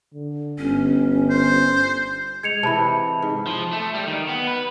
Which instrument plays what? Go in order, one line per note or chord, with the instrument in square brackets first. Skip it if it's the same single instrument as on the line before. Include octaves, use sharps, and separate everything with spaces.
[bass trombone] D3
[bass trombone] G1 [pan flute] C#4
[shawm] C5
[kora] G#3 [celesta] G#6 C#7 F7
[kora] C3 E3 [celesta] A5 B5
[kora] G#2
[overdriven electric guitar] F3
A3
G3
D#3
B3
B4